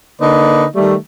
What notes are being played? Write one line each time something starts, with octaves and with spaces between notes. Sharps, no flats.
D3 A#3 D#4 B4 D5
D#3 G3 A3